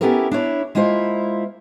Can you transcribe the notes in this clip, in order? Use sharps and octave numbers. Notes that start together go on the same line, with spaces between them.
B3 C#4 E4 G4 A4 A#4
D4 E4 C#5
G#3 A#3 E4 F4 C5